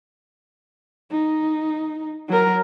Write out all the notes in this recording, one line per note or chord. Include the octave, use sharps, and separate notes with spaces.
D#4
F#3 A#4